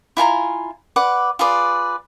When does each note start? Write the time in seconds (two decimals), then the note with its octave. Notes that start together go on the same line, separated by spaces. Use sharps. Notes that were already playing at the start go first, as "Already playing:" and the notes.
0.17 E4 F4 G#5 A#5
0.96 B4 D5 F#5 D6
1.39 F4 G#4 B4 D5